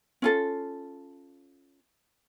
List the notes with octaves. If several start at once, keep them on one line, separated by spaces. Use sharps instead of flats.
C#4 F4 A4